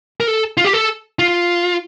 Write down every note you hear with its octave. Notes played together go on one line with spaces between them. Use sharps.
A#4
A4
F4
G4
A4
F4